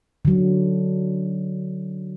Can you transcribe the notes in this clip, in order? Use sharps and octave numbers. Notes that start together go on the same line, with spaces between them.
D3 F#3